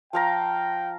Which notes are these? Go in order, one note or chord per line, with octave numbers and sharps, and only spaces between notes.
F3 F5 G5 A#5